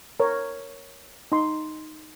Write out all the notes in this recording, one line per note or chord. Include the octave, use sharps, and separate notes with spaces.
A#4 C#5
D#4 C6